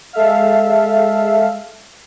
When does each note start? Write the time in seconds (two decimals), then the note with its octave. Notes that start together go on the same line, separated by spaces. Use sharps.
0.13 G#3 A4 E5 F5